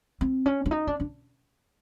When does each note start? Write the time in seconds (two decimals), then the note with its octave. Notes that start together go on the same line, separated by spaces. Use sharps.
0.21 C4
0.46 C#4
0.66 D4
0.71 D#4
0.87 D4
1.00 D4